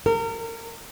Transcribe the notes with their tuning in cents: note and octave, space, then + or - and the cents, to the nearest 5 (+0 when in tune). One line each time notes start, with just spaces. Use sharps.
A#4 -30